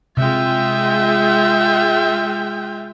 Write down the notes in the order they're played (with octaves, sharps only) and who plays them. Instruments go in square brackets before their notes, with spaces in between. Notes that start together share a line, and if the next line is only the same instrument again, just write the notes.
[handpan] C3 [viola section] G#3 F4 [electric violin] E5 G5